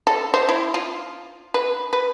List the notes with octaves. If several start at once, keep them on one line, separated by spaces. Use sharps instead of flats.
A4
C5
E4
F4
B4
B4